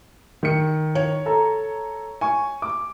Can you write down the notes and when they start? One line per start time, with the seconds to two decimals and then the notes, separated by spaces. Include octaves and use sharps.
0.43 D#3 C#7
0.95 C#5
1.26 A4 A#5
2.21 G#5 C#6
2.62 D6